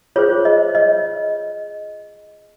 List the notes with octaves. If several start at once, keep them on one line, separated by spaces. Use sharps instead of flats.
F4 G#4 C5 C#5
D#5
D#5